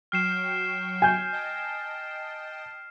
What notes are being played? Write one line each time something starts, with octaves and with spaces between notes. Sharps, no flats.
F#3 G5 C#6 F6 C7 E7
G#5 G6
D#5 G5 A5